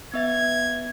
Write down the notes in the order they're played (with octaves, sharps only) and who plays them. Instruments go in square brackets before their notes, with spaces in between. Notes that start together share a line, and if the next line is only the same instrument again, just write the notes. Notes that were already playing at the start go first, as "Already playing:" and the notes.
[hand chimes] B3 E5 A6 [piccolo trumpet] G#6